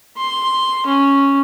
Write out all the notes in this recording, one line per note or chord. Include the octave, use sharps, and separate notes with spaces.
C6
C#4